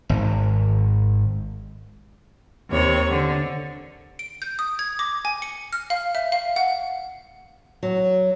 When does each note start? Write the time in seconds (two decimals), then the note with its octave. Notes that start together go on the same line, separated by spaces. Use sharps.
0.09 G#1
2.70 D#2 C3 C#5
3.10 D3
4.19 D7
4.42 G6
4.59 D#6
4.79 G#6
4.99 D6
5.25 G#5
5.42 C#7
5.73 F6
5.90 F5
6.15 E5
6.32 F5
6.56 F#5
7.83 F#3